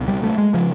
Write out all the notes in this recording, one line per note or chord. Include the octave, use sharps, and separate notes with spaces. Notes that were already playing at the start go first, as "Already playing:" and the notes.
Already playing: C#2 B2
G3
A3
G#3
C#3 F3